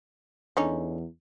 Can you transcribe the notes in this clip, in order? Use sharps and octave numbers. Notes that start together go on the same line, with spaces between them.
E2 D3 C#4 D#4